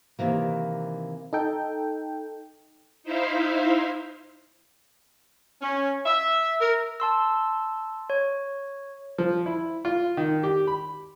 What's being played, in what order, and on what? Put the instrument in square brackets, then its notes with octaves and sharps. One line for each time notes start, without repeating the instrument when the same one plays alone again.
[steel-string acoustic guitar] C3 D#3 E3 A#3
[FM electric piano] D#4 A4 G5
[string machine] D#4 E4 C5 E5 F5
[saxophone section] C#4
E5
A#4
[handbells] A5 C6 E6
C#5
[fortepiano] F3
E4
F4
D#3
G4
B5